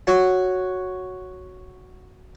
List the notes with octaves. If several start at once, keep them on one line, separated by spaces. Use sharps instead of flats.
F#4 C#5 F#5